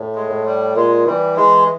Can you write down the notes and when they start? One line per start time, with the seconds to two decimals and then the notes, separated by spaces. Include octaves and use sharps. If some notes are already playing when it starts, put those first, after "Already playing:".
Already playing: A2
0.15 G#3
0.30 A2
0.46 G3
0.76 A#2 G#3
1.07 E3 G3
1.36 E3 G#3